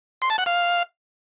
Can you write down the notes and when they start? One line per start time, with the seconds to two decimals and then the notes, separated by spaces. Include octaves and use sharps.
0.22 C6
0.30 A5
0.38 F#5
0.46 F5